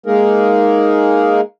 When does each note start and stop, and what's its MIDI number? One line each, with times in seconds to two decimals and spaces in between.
0.06 1.41 56
0.06 1.41 58
0.06 1.41 63
0.06 1.41 68
0.06 1.41 70